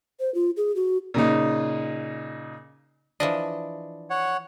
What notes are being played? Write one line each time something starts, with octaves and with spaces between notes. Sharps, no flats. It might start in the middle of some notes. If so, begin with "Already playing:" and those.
C5
F4
G#4
F#4
A#2 C#3 D#4
E3 F3 D4 D#5
C#5 F#5